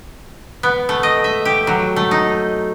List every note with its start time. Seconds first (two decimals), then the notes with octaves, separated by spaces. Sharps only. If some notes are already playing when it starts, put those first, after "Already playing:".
0.63 B3
0.89 A3
1.03 D#5
1.24 E5
1.45 G4
1.67 F#3
1.96 A3
2.11 D#4